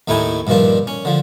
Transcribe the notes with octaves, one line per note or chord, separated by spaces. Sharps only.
D#2 A2 A3 D#4 E4 G#5
G2 A#2 D#3 F3 D4
C#4
D3 F3